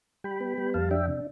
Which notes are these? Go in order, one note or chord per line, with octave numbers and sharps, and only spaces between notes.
G3 G5 B5
B3
G3
F2 F5 A5
D4 E5 G5
C3